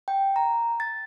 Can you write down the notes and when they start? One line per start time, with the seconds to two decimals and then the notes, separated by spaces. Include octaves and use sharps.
0.08 G5
0.36 A#5
0.80 A6